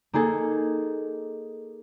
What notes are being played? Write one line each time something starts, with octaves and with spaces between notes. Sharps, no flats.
A#3 D#4 G#4 A4